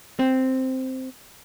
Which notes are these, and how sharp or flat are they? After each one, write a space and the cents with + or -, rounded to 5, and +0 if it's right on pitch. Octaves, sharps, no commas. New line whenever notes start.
C4 -5